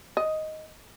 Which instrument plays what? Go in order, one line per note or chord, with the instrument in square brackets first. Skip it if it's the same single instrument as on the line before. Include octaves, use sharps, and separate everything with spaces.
[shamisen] D#5